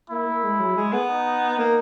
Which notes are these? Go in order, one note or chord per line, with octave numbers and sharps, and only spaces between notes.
A#3 E4
A#3
G#3
F#3
G#3
B3
D#4
A#3